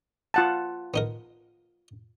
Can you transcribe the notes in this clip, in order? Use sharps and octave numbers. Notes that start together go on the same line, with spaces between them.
F4 F#5 A5
B3 D#4 A#4